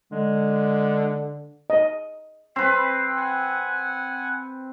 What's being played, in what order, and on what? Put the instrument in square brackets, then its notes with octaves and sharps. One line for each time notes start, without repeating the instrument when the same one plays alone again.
[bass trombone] D3 [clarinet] G#3
[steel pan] D#5
[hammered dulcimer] C4 B4 [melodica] F5
[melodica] F#5 G#5